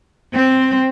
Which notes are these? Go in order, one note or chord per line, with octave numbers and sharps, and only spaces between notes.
C4